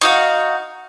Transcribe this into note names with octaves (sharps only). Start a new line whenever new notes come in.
D#4 F#4 F5